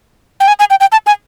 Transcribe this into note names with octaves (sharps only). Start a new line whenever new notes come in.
G5
G#5
G#5
G5
G5
A5
G#5